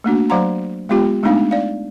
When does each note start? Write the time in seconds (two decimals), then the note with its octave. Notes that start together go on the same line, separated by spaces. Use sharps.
0.04 A3 A#3 D4 F#4
0.29 F#3 C5 F5 F#5 A#5 C6
0.89 G#3 B3 F4 G4 G5
1.23 G#3 A3 B3 D4 D#4 F5
1.51 D5 F5